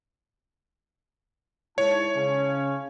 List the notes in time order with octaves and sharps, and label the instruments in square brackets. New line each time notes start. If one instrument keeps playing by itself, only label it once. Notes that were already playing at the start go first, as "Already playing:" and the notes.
[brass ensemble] G#2 E4 A5 [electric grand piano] C#5
[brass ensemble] C#3 C#4